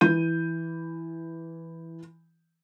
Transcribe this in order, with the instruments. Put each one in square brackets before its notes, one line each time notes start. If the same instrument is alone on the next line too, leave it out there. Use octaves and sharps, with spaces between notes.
[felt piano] E3 G6 D#7